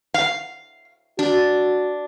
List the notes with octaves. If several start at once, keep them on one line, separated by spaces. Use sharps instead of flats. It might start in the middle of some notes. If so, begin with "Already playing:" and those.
F5
D4 F#4